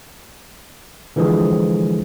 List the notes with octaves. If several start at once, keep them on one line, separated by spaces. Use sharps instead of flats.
D3 E3 F3 G#3 G#4